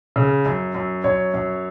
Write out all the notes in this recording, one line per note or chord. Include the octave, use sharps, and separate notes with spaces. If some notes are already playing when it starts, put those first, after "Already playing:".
C#3
F#2
F#2
F#2 C#5
F#2